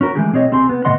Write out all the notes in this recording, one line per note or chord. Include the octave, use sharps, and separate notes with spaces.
C#4 F#4 A#4
E3 F#3 G#3 A3 G4 G#4
B1 C4 G#4 C#5 D#5
C2 C4 G4 G#4 C6
B3
A2 C#3 B3 D#5 F#5 C6